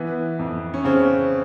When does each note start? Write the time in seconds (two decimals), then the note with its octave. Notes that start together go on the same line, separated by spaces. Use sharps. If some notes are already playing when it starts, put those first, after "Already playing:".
Already playing: E3 B3
0.39 F2
0.74 C#4
0.85 C#3 C4